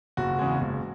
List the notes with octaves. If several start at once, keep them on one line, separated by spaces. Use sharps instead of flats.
F#1 F#4
E2 C#3 G#3
F#1